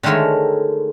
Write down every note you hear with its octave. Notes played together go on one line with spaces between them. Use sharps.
D3 D#3 G#3 A3 A#4 C#5